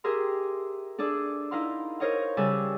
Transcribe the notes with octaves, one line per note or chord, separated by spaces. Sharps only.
G4 G#4 A#4 E5 C6
D4 G#4 A4 D5
D#4 E4 A#4 F5 C6
A#4 C5 C#5 D#5 F5
C#3 G3 A4 D5 E5 G#5